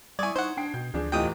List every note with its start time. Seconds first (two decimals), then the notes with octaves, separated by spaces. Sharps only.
0.19 G3 E4 D5 G#5 C#6 D#6 G#6
0.36 D#4 C5 F#5
0.57 D4 G5 C7
0.74 B2 G6
0.94 D2 F3 D4 G#4
1.12 E2 A2 E3 F4 G4 D#5 G5 D#6